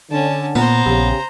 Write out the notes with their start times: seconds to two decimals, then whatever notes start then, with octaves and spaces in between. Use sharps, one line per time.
0.11 D3 C#4 A5
0.55 A#2 B3 C5 A#5
0.86 A#1 C#3 G4